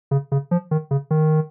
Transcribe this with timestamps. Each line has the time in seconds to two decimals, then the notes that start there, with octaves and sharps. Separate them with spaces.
0.11 C#3
0.32 C#3
0.51 F3
0.71 D#3
0.91 C#3
1.11 D#3